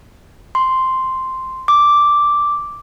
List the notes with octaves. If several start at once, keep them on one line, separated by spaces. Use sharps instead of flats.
C6
D6